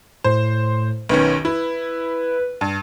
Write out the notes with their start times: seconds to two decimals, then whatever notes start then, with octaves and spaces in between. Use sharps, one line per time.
0.24 A2 C5
1.09 B1 D#3 C#4 B4
1.45 E4 B4
2.61 G2